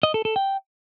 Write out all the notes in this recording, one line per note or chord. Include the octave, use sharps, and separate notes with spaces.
D#5
A4
A4
G5